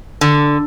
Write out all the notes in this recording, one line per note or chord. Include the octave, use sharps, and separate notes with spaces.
D3